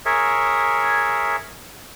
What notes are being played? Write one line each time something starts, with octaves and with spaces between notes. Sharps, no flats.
G#4 A#4 C#5 E5